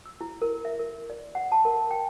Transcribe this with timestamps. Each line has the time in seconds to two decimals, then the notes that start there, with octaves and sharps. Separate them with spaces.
0.06 E6
0.21 E4
0.42 A#4
0.65 E5
0.79 A#4
1.10 D5
1.35 F#5
1.52 A5
1.65 A#4
1.91 G5